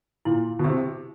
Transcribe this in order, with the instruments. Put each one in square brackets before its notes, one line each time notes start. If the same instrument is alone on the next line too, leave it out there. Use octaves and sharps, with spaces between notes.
[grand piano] A#2 [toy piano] E4
[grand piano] B2
[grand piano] C3 [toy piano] G4